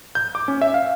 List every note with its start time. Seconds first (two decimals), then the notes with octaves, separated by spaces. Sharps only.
0.15 G6
0.35 D6
0.48 C#4
0.61 E5
0.74 F5